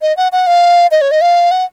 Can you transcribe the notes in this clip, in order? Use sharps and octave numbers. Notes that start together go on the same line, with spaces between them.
D#5
F#5
F#5
F5
D#5
C#5
D#5
F5
F#5